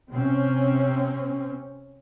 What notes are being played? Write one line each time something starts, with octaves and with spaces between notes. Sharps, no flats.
C3 C4 C#4